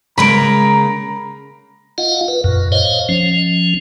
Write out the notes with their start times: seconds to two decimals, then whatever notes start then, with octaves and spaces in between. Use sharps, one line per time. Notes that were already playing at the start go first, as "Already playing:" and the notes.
0.18 C#3 G#3 A#3 A#5 B5 D7
1.98 F4 D#5 F5 F#5
2.28 B4
2.44 F#2 A#2
2.72 C5 C#5 D#5 F5
3.09 F3 C#4